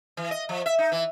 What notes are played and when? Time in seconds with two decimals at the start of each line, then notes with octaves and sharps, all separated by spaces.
0.17 E3
0.31 D#5
0.49 F3
0.66 E5
0.79 D#4
0.92 E3